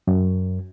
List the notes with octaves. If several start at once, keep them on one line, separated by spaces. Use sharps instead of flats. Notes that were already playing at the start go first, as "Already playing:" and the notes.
F#2